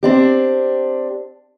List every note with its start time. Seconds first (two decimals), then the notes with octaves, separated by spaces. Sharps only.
0.03 C4 D4 G4